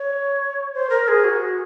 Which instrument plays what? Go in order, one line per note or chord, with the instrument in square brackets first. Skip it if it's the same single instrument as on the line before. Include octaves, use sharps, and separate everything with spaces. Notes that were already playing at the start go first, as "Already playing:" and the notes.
Already playing: [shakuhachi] C#5
C5
A#4
G#4
F#4